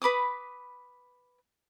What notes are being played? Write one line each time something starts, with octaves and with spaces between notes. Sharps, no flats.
B4 B5 D6 D#6